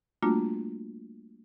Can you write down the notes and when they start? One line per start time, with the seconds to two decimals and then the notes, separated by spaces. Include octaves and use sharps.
0.23 G3 A3 A#3 D4 F4 F#4